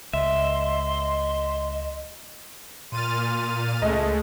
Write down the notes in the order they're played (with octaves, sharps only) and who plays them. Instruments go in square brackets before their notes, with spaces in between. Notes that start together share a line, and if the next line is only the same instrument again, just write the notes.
[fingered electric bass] C#2 [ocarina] D#5 [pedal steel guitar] E5 [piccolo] C6
[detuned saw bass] A#2 [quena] C6 [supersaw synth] F6 A6 D#7
[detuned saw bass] C#2 [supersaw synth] G#3 A3 [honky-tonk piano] D#5 [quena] A5